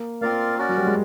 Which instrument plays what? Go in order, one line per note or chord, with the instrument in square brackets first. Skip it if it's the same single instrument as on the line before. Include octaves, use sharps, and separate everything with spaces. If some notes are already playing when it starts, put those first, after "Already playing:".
Already playing: [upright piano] A#3
[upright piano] A#3 [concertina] C4 F4 A#4 D5 F5
[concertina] C#4 F#4 A#4 D5
[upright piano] F#3
G3
G#3